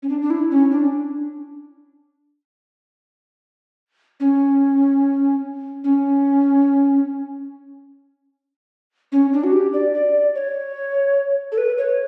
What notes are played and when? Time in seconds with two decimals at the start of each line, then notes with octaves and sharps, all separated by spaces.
0.03 C#4
0.09 D4
0.22 D4
0.30 E4
0.50 C#4
0.71 D4
4.20 C#4
5.84 C#4
9.12 C#4
9.33 D4
9.44 F#4
9.53 G4
9.73 D5
9.94 D5
10.35 C#5
11.52 A4
11.58 B4
11.78 C#5